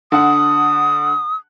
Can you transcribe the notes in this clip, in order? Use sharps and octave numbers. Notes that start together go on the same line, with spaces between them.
D3 F#5 D#6